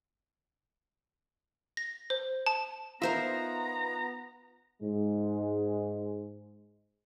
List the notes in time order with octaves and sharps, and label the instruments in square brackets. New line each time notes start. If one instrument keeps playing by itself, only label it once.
[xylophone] A#6
C5
A5
[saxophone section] B3 [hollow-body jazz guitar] D#4 F4 [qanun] A#4 C5 E5 [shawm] A#5
[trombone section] G#2 G#3